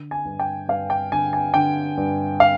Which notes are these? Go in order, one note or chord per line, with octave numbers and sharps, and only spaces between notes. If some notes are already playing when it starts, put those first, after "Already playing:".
Already playing: D3
G#5
G2
G5
G2 F5
G5
D3 G#5
G#5
D3 G5
G2
F5